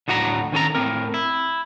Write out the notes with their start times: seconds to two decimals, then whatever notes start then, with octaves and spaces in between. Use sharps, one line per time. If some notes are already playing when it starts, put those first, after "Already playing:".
0.08 D2 A2 F#4 F#5 A#5
0.52 D#3 C#4 A4 A#5
0.75 A2 C4 A#4
1.14 E4